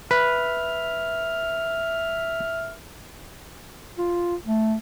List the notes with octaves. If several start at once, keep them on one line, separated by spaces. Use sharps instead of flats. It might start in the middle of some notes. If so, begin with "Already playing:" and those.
B4 E5 F6
F4
A3